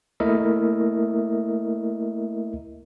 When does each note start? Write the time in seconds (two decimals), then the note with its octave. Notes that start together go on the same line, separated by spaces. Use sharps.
0.20 A3 A#3 E4 A#4 D#5 E5